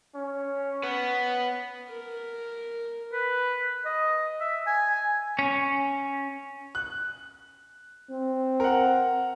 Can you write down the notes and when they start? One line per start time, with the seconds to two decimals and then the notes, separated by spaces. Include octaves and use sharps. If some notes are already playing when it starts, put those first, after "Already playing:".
0.15 C#4
0.83 B3
1.90 A#4
3.13 B4
3.85 D#5
4.40 E5
4.66 G#5
5.39 C#4
6.75 F#6
8.11 C4
8.60 A#4 F#5